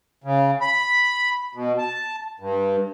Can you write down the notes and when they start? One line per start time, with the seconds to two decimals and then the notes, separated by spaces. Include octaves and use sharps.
0.24 C#3
0.61 B5
1.55 B2
1.79 A5
2.40 G2